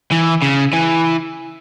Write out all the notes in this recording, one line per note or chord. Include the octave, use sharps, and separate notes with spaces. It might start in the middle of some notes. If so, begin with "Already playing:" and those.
E3
C#3
E3